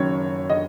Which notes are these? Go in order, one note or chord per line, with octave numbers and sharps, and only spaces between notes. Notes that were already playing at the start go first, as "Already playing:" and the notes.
Already playing: F#1 F#2 D#3 C#5
D#5